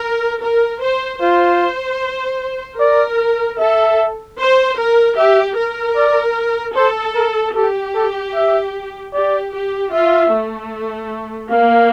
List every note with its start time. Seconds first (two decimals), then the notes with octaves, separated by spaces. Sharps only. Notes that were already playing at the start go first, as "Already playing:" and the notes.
Already playing: A#4
0.42 A#4
0.82 C5
1.21 F4 C5
2.79 A#4 D5
3.59 A4 E5
4.38 C5
4.78 A#4
5.17 G4 E5
5.57 A#4
5.96 D5
6.75 A4 C5
7.15 A#4
7.55 G4 A4
7.95 A4
8.35 E5
9.13 G4 D5
9.54 G4
9.92 F4 E5
10.33 A3
11.51 A#3 F5